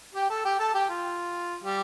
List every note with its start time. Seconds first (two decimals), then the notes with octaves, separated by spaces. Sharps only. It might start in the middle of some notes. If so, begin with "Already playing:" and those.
0.15 G4 G5
0.30 A4 A5
0.45 G4 G5
0.60 A4 A5
0.74 G4 G5
0.89 F4
1.64 G3 G4